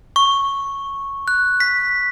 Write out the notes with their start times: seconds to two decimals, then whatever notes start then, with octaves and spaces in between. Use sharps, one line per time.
0.16 C#6
1.28 F#6
1.60 B6